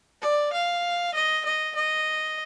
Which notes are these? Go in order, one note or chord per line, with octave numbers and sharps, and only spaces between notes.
D5
F5
D#5
D#5
D#5